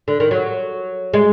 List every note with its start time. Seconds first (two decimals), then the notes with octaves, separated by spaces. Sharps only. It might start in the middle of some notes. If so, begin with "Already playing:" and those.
0.08 D3
0.20 D#3
0.31 F#3
1.14 G#3